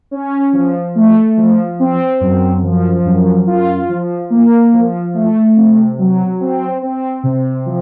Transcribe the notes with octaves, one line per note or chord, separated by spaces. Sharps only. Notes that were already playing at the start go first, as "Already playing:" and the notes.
C#4
F3
A3
F3
C4
F#2
F3
F#2
F4
F3
A#3
F3
A3
C3
F#3
C4
C4
C3
F3